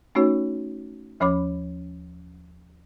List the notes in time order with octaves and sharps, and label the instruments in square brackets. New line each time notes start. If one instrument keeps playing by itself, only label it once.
[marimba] A3 C#4 D#4 F#4 C#5
D#2 F3 C#4 C#5 B5 D6